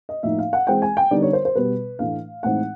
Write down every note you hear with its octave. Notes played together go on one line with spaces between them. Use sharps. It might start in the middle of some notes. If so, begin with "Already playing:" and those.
D#5
A2 F3 A#3 D#4 E5
F5
F#5
E3 G#3 C4 G5
G#5
G5
D3 G3 B3 D#4 D5
C#5
C5
C5
B2 G3 B3 B4
A2 E3 A3 D4 F5
A2 E3 G#3 C4 D#4 F#5